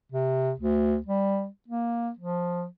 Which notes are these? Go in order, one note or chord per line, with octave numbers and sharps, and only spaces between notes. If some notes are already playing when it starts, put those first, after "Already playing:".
C3
D2
G3
A#3
F3